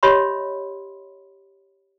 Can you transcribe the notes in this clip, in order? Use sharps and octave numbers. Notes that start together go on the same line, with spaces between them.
G4 C#5 D#5 E5 B5 C6